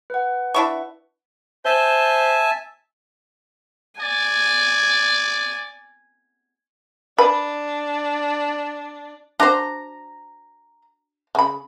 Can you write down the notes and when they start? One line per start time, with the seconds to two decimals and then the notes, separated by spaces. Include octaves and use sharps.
0.10 B4 F#5
0.54 D4 E4 C#6
1.65 C5 E5 G#5 A5
4.01 D5 G#5
7.18 D4 B4
9.40 D4 F#4 C5 A#5
11.35 C#3 B5